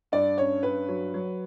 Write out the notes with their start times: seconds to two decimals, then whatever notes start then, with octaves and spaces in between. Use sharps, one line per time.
0.12 G2 D5
0.38 C#4 C#5
0.63 G2 B4
0.88 F#3
1.14 F#3